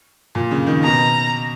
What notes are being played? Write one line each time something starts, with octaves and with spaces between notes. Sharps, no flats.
A#2
C#3
D#3
B2 A#5